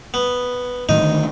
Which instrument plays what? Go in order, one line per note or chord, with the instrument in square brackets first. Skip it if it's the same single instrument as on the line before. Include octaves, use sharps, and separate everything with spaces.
[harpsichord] B3
[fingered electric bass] A2 D#3 F#3 [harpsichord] D#4 D#5
[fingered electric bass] D3 D#3 A3